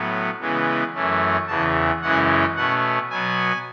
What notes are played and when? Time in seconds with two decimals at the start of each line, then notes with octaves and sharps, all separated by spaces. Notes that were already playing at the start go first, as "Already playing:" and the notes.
Already playing: A2 F#3 B3
0.40 C#3 E3 G#3 B3
0.94 F#2 E3 A3 C#4
1.48 E2 C#3 E3 A5
2.02 F#2 C#3 E3 G#3 C#4 F#5
2.56 B2 A3 C#4 F#5
3.10 B2 F#3 B3 G#5